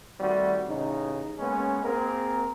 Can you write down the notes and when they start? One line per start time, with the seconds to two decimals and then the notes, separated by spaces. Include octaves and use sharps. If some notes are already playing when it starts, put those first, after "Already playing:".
0.19 D#3 G3 A3 C4 F#4
0.68 A1 C#3 D#4
1.39 G#3 A#3 B3 C#4
1.83 A#3 C4 G#4 A#4